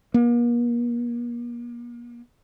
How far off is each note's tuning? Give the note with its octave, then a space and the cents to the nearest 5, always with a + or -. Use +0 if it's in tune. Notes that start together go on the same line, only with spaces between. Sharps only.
A#3 +40